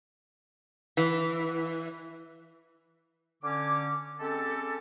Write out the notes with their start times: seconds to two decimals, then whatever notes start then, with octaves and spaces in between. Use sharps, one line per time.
0.97 E3
3.43 D3 C#4 D6
4.20 G#3 C4 C#4 G4 A4